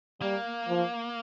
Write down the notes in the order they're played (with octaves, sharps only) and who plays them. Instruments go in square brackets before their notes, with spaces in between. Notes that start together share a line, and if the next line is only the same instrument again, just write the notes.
[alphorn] G3 [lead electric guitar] A#3
[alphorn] F3